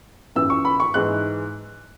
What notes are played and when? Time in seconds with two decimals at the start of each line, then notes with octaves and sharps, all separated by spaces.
0.36 F#2 E3 E6
0.50 C#6
0.65 B5
0.80 C#6
0.94 G#2 E3 F#6